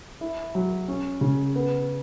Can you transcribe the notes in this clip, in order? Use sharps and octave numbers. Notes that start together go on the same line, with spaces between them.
E4
F#3
C#4
C#3
B3